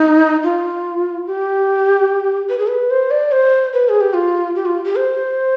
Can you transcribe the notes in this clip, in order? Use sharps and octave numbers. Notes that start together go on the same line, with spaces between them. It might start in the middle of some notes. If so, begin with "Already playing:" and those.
Already playing: D#4
F4
G4
B4
G#4
B4
C5
D5
C5
B4
G#4
G4
F4
G4
F4
G4
C5